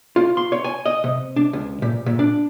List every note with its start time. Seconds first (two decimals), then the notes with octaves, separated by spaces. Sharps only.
0.16 F4
0.37 C6
0.52 C#5
0.64 G#5
0.86 D#5
1.04 C3
1.36 D4
1.53 C#2
1.82 A#2
2.06 A#2
2.19 D4